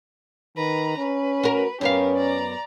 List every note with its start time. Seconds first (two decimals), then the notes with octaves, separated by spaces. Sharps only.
0.57 D#3 B4 A#5
0.98 C#4 B4
1.43 F#4 A#4
1.81 F#2 B3 C#4 G4 A#4 F5
2.16 D5 A#5